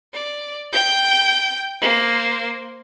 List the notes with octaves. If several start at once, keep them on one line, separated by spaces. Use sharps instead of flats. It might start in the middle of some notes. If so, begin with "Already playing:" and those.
D5
G5 G6
A#3 C5